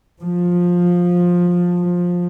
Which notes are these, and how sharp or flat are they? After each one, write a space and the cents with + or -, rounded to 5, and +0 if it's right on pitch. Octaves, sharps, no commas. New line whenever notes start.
F3 +15